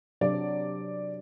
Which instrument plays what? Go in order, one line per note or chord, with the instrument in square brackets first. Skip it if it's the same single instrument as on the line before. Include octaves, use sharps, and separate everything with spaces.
[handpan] C3 F#3 D4 [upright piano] D5